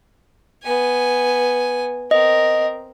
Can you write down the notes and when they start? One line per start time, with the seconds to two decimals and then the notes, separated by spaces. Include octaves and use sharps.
0.63 B3 G#5
2.11 C4 A#4 D#5